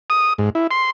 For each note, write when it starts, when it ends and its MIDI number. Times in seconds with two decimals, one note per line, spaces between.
0.10 0.33 87
0.38 0.50 44
0.55 0.67 64
0.71 0.90 84